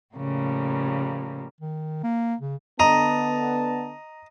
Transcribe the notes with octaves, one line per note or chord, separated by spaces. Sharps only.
A2 C#3 F3 G3 A#3
D#3
A#3
C#3
D3 B3 D#5 A5 A#5